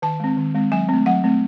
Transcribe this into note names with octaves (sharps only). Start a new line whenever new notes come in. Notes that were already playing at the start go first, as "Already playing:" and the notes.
D#3 A5
G#3 C4
D#3
G#3 C4
F#3 G#5
A3 C4
F#3 F#5
A3 C4